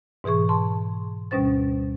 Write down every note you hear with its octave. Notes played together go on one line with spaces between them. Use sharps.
G#2 B2 E3 G#4 C#6
A5 C6
D2 B2 G3 C#4 C5 A6